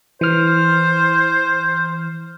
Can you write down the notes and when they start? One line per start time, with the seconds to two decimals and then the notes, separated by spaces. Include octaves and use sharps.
0.21 E3 C5 F6